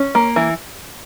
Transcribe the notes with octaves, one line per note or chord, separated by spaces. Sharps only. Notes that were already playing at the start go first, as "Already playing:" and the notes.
Already playing: C#4
A#3
E3